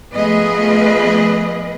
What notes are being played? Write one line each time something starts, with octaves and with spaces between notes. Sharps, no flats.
F3 A3 B3 G#4 B4 D#5